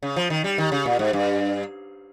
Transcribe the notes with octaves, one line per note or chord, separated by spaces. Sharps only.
C#3
F3
D#3
G3
D#3
C#3
A#2
G#2
G2